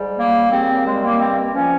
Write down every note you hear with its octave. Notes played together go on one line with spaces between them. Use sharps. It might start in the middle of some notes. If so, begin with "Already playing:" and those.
Already playing: G#2 G3
C#3 A#3
D#2 C4
G3 G#3
A#3
G2 C4
F3 C#4